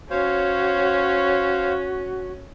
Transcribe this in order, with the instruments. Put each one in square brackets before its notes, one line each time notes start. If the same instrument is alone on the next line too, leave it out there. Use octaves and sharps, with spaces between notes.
[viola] C#4 [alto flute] F#4 [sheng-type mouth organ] C5 C#5 F5